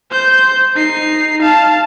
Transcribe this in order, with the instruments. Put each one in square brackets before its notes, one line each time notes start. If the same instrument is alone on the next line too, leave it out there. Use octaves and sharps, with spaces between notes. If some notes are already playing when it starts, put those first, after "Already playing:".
[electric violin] C5 G6
D#4 C7
F5 A5